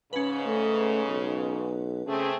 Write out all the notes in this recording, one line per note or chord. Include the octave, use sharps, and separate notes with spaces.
G#2 C#3 C#4 B4
A3
B1
C#3 A3 C4 G#4